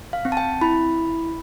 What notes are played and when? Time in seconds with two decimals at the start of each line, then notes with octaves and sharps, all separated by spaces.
0.13 F5
0.25 C4
0.32 A5
0.37 G5
0.61 E4 B5